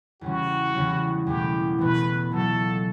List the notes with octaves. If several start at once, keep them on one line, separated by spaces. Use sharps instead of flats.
E2 C#3 G3 C#4 F#4
E2 C#3 G3 C#4
E2 B2 A3 G4
E2 B2 A3 B4
C#2 B2 F#3 C#4 A4